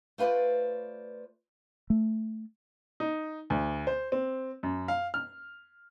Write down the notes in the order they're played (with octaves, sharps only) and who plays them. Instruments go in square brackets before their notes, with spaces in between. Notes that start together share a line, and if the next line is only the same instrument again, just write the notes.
[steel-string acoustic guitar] A3 F4 B4 C5 D5
[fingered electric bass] A3
[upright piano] D#4
D2
C5
C4
F#2
F5
F6